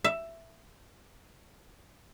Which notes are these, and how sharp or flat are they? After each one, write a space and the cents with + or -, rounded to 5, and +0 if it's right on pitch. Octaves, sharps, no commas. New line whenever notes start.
E5 +10